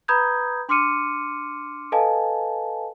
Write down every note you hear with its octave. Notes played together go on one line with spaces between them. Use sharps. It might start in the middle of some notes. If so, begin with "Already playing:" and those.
B4 A#5 B5 D#6 G6 G#6
D4 C6 D6 F6 C#7 D#7
A4 B4 D#5 F5 G#5 A5